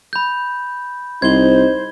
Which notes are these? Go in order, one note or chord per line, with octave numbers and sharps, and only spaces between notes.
B5 G6
C2 D#4 C5 G#6 G7